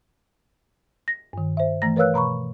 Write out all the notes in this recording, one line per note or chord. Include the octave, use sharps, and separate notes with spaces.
A#6
G2 D#3
C5 E5
E3 A3 A#5 A#6
A#4 B4 C#5 F5 E6 F#6
B2 A#5 B5 C#6